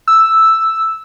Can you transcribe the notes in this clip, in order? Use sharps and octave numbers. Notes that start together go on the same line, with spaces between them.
E6